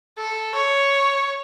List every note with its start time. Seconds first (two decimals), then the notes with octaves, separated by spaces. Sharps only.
0.18 A4
0.55 C#5